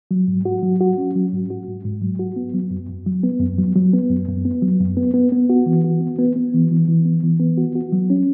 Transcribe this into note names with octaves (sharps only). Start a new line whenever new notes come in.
F#3
G#2
F#4
F#3
F#4
C#4
F#3
G#2
F#4
G#2
G#2
F#3
F#4
B3
F#3
F#2
F#2
F#3
B3
F#2
F#3
F#3
B3
F#2
F#2
B3
F#3
F#2
B3
B3
B3
F#4
E3
F#4
B3
B3
B3
E3
E3
E3
B3
E3
B3
F#4
F#4
F#3
C#4